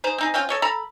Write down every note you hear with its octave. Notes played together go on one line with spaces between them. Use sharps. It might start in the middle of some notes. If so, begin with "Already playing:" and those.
D#4 G#4 C5
C4 D#4 G#4
C4 C#4 F4 G5
A4 C#5 D#5
A4 A#5 B5